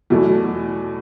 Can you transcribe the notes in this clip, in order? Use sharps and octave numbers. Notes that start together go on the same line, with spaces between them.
E2 B2 F#3 A3